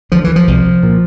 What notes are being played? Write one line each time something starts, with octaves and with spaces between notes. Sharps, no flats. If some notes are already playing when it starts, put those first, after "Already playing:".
D2 D3 F3
E3
F3
C2
A#2